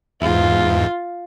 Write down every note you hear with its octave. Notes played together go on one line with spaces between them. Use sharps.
E2 G#2 F4